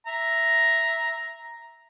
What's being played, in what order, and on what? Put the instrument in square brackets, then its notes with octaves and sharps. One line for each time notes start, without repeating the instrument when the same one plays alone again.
[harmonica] E5 A#5